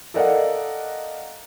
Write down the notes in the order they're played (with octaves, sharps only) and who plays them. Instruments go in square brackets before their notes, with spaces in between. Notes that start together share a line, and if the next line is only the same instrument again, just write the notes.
[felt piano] A4 A#4 D5 D#5 F5 F#5